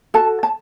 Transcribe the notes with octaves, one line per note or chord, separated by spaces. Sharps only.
F#4 A4 A5
A5